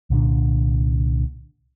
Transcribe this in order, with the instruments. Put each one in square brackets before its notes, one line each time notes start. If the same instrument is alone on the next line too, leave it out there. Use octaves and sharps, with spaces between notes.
[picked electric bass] C2 A#2 D3 D4